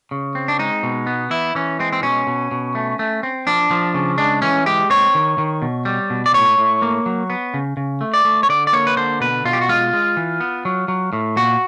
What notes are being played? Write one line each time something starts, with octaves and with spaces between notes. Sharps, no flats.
C#3
C4
D4
G#3 D#4
B2
B3
E3 E4
E3 C#4
G#3 C4
C4
B2 C#4
B2
B2
A3
A3
C4
F3 D4
F3
C#3
G#3 D4
E3 C#4
G#3 G4
C4 C#5
D#3
D#3
B2
G3
B2
D5
A2 C#5
A2
A#3
F#3
B3
C#3
C#3
A3
D5
A3
C#5
D3 D5
D5
A#3 C#5
B4
D3 C5
B2 B4
B2 F4
G4
F#4
G#3 F4
G#3
E3
B3
F#3
F#3
A2
A#2 F#4